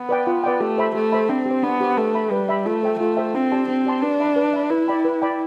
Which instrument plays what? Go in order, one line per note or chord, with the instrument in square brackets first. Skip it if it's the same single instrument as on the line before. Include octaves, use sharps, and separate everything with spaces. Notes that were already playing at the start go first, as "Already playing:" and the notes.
Already playing: [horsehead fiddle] B3
[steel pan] B4 D5 G5
F4
B4 D5 G5
[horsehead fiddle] A3 [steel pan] G4
[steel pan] C5 E5 B5
[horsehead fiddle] A3 [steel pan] G4
[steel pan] C5 E5 B5
[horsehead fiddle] C4 [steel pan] D4
[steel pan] G4
C5
[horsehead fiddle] B3 [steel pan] D4
[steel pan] G4 C5
[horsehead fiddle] A3 [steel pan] B4
[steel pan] E5 B5
[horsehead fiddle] G3 [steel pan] B4
[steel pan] E5 B5
[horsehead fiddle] A3 [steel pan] F4
[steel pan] A4 C5 E5 G5
[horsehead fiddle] A3 [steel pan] F4
[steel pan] A4 C5 E5 G5
[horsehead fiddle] C4 [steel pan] D4
[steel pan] G4 D5 A5 C6
[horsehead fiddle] C4 [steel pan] D4
[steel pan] G4 D5 A5 C6
[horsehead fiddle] D4 [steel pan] B4
[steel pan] E5 B5
B4
E5 B5
[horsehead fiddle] E4 [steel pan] B4
[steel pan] D5 G5 B5
B4
D5 G5 B5